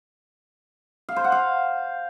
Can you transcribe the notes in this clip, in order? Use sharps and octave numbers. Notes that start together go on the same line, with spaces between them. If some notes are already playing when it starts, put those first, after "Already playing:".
F5
C5
F#5
F5